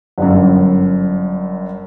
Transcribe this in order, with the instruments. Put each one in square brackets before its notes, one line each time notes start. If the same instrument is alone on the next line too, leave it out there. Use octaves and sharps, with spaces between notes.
[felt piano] G1 F#2